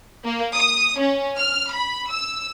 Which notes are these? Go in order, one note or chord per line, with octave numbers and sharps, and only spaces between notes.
A#3
D#6
C#4
F6
B5
E6